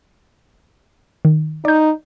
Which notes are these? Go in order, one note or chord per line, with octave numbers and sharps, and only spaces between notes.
D#3
D#4 D5 G6